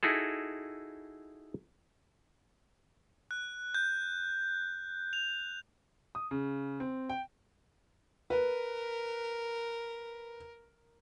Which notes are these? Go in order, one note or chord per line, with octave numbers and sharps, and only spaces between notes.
D#4 E4 F#4 G#4 A4
F#6
G6
F7
D#6
C#3
C4
G5
A#4 B4